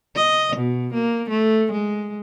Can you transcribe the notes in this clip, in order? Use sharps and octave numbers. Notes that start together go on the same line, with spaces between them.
D#5
B2
A#3
A3
G#3